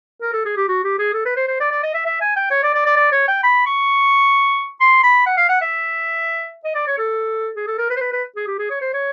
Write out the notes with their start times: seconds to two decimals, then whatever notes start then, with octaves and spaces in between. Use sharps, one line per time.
0.22 A#4
0.33 A4
0.45 G#4
0.57 G4
0.68 F#4
0.84 G4
0.99 G#4
1.13 A4
1.26 B4
1.36 C5
1.48 C5
1.60 D5
1.71 D5
1.83 D#5
1.94 E5
2.06 E5
2.21 G#5
2.36 G5
2.51 C#5
2.63 D5
2.74 D5
2.86 D5
2.97 D5
3.12 C#5
3.28 G5
3.44 B5
3.66 C#6
4.81 C6
5.03 B5
5.26 F#5
5.37 F5
5.49 F#5
5.61 E5
6.65 D#5
6.75 D5
6.87 C#5
6.98 A4
7.56 G#4
7.67 A4
7.78 A#4
7.90 B4
7.97 C5
8.01 B4
8.12 B4
8.36 G#4
8.47 G4
8.59 G#4
8.70 C#5
8.81 C5
8.93 C#5